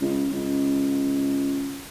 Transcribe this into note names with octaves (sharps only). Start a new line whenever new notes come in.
C#2
C#2